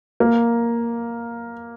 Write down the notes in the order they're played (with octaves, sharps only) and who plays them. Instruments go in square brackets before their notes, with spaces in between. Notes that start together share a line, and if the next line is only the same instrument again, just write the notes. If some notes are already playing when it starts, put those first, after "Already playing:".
[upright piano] A#3